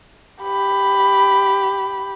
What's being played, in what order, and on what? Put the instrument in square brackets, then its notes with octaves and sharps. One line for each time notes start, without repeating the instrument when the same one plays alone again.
[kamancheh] G4 B5